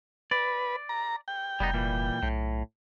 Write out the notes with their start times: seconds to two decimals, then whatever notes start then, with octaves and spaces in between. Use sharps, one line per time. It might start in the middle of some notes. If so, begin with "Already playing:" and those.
0.31 B4 D5
0.89 A#5
1.28 G5
1.60 F1 G3 B3 D#4
1.74 A#2 E3 G3
2.23 B1 A2